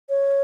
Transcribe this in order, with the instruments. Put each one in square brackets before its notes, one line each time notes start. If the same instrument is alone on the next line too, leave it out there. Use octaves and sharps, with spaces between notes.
[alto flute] C#5